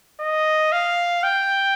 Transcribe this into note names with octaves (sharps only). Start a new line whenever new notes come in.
D#5
F5
G5